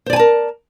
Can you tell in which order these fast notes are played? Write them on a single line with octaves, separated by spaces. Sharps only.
C5 D5 G#5 A5 A#4